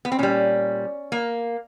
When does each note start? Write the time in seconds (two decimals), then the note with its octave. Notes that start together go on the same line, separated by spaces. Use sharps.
0.05 B3
0.12 C4
0.19 A#2 G3 C#4
1.12 A#3